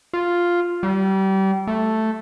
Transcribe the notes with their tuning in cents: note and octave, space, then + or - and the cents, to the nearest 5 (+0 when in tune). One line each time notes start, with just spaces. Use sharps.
F4 +0
G3 -30
A3 +0